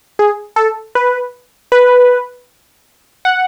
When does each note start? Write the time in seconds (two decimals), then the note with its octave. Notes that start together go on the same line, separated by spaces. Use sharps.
0.19 G#4
0.56 A4
0.95 B4
1.72 B4
3.25 F#5